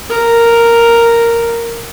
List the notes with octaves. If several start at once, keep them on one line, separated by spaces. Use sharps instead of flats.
A#4